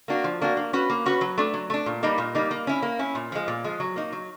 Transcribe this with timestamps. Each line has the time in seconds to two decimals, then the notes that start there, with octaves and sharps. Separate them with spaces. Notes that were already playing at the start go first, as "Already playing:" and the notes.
0.08 A#3 D4 F#4
0.24 F3
0.41 A#3 D4 F#4
0.57 A#3
0.73 C#4 F#4 B4
0.90 A#3
1.06 C#4 F#4 B4
1.21 F#3
1.38 A3 D4
1.54 F#3
1.70 A3 D4
1.86 A#2
2.03 G3 A#3 D#4
2.18 A#2
2.35 G3 A#3 D#4
2.51 A#3
2.67 C#4 E4
2.83 A#3
2.99 C#4 E4
3.15 A#2
3.32 F3 G#3
3.48 A#2
3.64 F3 G#3
3.80 F#3
3.96 A#3 D#4
4.12 F#3